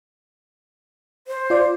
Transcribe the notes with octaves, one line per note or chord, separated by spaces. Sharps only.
C5
F4 D5